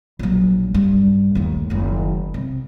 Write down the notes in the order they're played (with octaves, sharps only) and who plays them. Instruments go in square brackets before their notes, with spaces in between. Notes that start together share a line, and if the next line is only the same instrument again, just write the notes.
[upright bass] A#1 F#3
G2
D#2 A3
F#1 D#3
C3